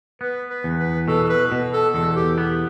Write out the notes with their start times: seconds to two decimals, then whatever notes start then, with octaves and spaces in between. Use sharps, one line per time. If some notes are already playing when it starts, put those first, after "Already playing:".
0.21 B3 B4
0.50 B4
0.64 E2
0.79 B4
1.08 B2 A4
1.24 A4
1.30 B4
1.52 B2
1.73 A4
1.94 E2 A4
2.16 G4
2.38 B3 G4